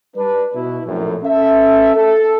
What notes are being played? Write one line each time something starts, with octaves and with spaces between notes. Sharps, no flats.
G3 D4 B4
B2 E4
A#1 F#2 A2
C#4 A4 E5
A4